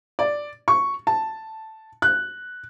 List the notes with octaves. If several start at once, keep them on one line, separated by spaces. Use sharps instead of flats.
D5
C#6
A5
F#6